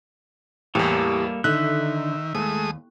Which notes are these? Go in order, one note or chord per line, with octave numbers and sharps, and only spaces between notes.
E2 A2 E3 G3 A#3 G4 A4
D3 D#3 D#4 E5 F#6
D#2 G#3 A3 D#6